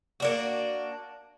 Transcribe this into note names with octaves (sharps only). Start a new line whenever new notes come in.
A#3 D4 F#4